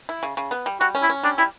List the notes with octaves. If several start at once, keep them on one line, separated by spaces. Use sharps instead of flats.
E4
C#3
C#3
B3
G3
G3 F#4
C#4
E4
C#4
G3 D4
G3 E4